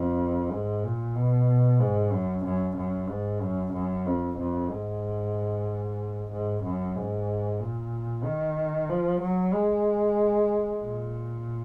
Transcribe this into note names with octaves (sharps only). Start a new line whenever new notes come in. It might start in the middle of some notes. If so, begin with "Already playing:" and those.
Already playing: F2
G#2
A#2
B2
G#2
F#2
F#2
F#2
G#2
F#2
F#2
F2
F2
G#2
G#2
F#2
G#2
A#2
D#3
F3
F#3
G#3
A#2